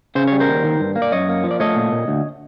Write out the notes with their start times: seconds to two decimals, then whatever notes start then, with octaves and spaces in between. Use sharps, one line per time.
0.15 C#3 C5
0.28 G3 C#5
0.40 A#4 C5
0.48 D#2
0.64 D#3
0.80 G2
0.96 A#3
1.02 D5
1.12 F#2 C#5 D#5
1.29 A#3
1.44 F3
1.51 D5
1.60 A3 C#5 D#5
1.76 A#2
1.92 A#2
2.08 D2